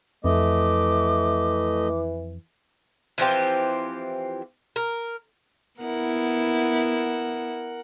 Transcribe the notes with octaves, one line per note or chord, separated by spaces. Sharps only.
F2 E3 A3 D#5 D6
E3 F3 C4 G4
A#4
B3 E4 A#4 F#5